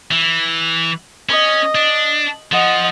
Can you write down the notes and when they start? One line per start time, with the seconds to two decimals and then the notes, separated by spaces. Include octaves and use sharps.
0.11 E3
1.29 C#4 D#5
1.75 D4
2.52 F3 D#5 F#5